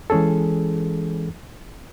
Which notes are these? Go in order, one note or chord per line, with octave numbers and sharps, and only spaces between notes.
E3 G#3 C#4 G#4 A4